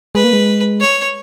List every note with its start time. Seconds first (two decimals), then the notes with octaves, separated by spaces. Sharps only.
0.15 G#3 B4
0.24 A#3
0.33 G#3
0.81 C#5